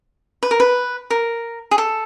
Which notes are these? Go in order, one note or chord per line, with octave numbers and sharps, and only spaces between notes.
B4
A#4
B4
A#4
G#4
A4